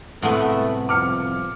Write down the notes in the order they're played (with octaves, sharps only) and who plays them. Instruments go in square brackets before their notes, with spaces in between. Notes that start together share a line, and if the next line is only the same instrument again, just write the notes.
[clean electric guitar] C2 F#5 [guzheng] A2 G#3 B3 [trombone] A3
[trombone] F3 [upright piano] D6 F6 C#7